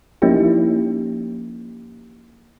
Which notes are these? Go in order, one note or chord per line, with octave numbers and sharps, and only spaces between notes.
F3 A#3 C#4 D#4 E4 G4